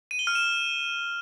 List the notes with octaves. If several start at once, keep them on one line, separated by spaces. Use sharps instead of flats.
D#7
G7
F6
E7